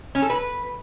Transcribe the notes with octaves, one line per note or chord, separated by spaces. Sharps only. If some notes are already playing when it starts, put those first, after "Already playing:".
C#4
A4
B4